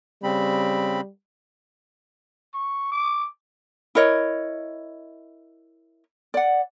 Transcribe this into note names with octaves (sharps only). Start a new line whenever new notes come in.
C#3 G3 C4 B5
C#6
D6
E4 A#4 C#5 D#5
D5 F#5